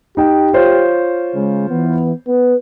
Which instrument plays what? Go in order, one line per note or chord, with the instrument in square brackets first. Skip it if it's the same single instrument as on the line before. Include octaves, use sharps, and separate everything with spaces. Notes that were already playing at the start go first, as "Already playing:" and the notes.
[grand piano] D#4 G5 [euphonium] G4
[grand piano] F4 C5 C#5
[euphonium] C#3 [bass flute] G#3
[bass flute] E3 [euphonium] B3
[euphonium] B3 [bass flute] B4